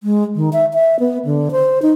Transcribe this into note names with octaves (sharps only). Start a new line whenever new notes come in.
G#3
D#3
E5
E5
B3
D3
C5
D#4